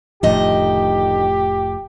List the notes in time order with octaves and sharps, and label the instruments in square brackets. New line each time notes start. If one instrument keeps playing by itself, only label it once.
[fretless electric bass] F1 A2 F3 [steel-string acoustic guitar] D2 D#3 D#5 [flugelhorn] G4